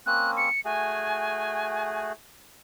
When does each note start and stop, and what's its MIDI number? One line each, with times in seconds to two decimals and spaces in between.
0.06 0.49 58
0.06 0.49 60
0.06 0.49 61
0.06 0.31 90
0.37 0.60 97
0.65 2.12 57
0.65 2.12 66
0.65 2.12 68
0.65 2.04 80